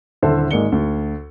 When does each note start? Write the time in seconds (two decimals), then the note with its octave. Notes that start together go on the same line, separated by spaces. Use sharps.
0.22 D#1 D3 E4 A4 C5 E5
0.51 G#1 G#3 A#3 D5 C#7 G7
0.72 D2